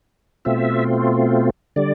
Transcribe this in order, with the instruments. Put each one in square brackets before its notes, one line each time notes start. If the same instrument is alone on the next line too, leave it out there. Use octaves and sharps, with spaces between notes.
[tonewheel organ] B2 A3 C4 F4 E5
D3 G3 D5